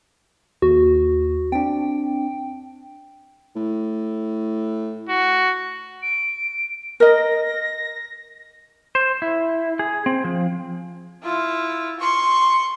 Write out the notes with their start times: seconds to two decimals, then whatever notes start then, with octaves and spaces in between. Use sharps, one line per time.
0.62 D#2 F#4
1.52 C4 D4 G5
3.56 A2
5.09 F#4
6.02 D7
7.00 A#4 D#5 A#6
8.95 C5
9.22 E4
9.79 G#4
10.06 C4
10.25 F3
11.23 E4 F4
12.00 C6 C#6